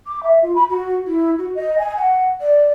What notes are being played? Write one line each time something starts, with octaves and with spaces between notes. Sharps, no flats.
D6
E5
F4
B5
F#4
E4
F#4
D#5
G#5
F#5
D5